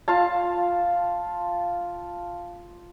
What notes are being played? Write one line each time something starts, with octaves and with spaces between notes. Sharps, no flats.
F4 F5 A5